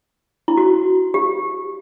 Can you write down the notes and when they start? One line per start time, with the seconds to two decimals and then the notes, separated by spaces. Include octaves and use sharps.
0.48 E4
0.57 F#4
1.14 G4